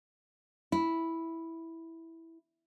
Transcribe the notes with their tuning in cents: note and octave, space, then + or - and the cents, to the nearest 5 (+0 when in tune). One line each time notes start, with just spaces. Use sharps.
E4 -5